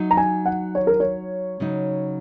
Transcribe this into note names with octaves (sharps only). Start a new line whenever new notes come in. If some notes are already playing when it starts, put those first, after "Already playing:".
Already playing: F#3 D#4
A#5
G#5
F#5
C#5
A#4
C#5
C#3 F#3 D#4